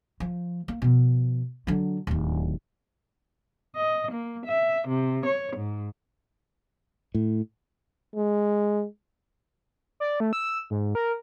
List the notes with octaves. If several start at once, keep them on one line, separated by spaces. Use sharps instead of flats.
F3
A#3
B2 F3
D3 F#3
D1 D#2
D#5
A#3
E5
C3
C#5
G#2
A2
G#3
D5
A3
E6
G#2
A#4